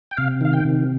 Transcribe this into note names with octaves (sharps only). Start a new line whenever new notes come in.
G5
C3 F5
D#3 F5
G5
C3